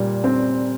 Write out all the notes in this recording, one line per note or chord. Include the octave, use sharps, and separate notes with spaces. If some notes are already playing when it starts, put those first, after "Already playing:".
Already playing: A#2 G3
C4